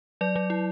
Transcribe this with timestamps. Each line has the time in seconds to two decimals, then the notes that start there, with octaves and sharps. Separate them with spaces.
0.21 F#3 D5
0.36 F#3
0.50 E4